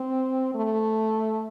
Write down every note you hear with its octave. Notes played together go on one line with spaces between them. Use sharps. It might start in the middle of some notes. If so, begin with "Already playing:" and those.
Already playing: C4
A3